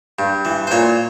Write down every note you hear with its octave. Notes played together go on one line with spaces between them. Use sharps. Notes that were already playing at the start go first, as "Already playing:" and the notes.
G2
E3
C5
A#2 C#5